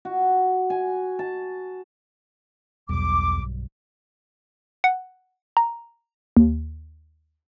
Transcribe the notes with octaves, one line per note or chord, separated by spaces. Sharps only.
F#4
G#5
A5
B1 E2 G2 D6
F#5
A#5
D#2